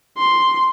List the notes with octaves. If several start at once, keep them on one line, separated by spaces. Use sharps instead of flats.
C6